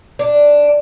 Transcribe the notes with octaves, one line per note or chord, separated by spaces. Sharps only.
D4